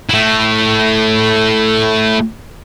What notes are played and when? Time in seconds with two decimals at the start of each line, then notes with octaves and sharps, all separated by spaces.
0.09 A3 E4